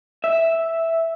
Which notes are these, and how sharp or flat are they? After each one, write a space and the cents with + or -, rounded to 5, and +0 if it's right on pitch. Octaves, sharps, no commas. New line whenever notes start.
E5 -5